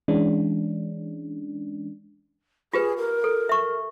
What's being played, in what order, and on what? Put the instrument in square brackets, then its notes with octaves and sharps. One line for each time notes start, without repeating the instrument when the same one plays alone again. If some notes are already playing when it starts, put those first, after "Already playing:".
[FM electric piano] E3 G#3 C#4 D4
[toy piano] F4 G4 B4 [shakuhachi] G#4
[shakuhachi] A#4
[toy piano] A4
E5 C#6